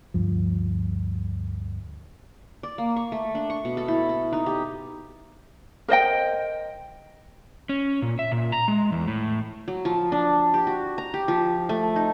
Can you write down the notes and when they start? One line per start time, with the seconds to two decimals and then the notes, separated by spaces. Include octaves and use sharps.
0.14 D2 G2 F3
2.63 D5
2.78 A#3
2.96 C#6
3.12 A3
3.35 D4
3.50 C#6
3.65 B2
3.77 A4
3.88 E4
4.09 A4
4.33 D#4
4.46 G4
5.88 A#4 C5 D#5 G5
7.69 C#4
8.02 A#2
8.19 E5
8.32 A#2
8.52 A#5
8.68 G#3
8.92 E2
9.07 A2
9.68 F#3
9.85 F3
10.12 D4
10.54 G4
10.67 F#4
10.98 A#5
11.14 G4
11.28 F3
11.69 A3
11.96 D#4